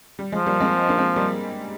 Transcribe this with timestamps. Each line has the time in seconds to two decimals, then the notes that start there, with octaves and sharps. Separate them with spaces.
0.19 G3
0.32 F3 G#3
0.46 G3 A#3
0.60 G#3 C4
0.89 A#3 D4
0.97 G#3 C4
1.16 G3 A#3